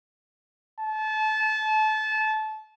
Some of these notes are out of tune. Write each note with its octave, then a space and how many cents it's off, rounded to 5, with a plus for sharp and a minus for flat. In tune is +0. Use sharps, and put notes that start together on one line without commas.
A5 -25